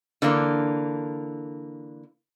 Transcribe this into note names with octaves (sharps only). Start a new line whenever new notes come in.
D3 E3 A#3